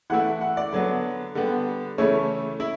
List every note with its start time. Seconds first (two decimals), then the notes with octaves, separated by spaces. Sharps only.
0.10 E3 A3 E4 F#5
0.41 F#5
0.57 D5
0.73 D3 F#3 B3
1.35 D3 G3 B3
1.98 C#3 E3 A3 C#4 E4 C#5
2.60 E4